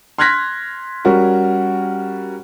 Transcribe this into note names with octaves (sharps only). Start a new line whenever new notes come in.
C6 F6 F#6 G#6 A#6 B6
G3 C#4 F#4 A#4